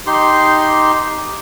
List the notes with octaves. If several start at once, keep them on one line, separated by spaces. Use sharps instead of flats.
D#4 G4 C6